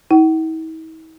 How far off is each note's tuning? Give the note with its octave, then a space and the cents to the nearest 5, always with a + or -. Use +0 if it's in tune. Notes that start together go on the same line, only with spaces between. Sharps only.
E4 -45 F#5 +45